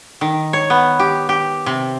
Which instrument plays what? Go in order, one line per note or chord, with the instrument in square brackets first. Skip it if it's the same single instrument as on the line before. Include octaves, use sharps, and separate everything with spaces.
[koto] D#3
C#5
B3
G4
G4
C3